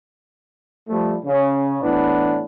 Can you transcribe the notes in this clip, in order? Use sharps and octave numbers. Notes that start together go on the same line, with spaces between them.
F3 G3 A3
C#3
A2 E3 B3 D4